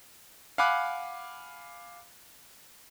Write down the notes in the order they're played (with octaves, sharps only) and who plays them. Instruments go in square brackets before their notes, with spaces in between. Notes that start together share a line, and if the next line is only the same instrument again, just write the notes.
[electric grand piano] F5 F#5 G#5 B5 D6 F#6